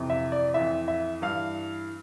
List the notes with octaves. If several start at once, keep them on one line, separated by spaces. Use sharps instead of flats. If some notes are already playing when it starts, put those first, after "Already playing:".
Already playing: F2 C3 E3
E5
D5
F2 E3 E5
E5
G2 E3 F5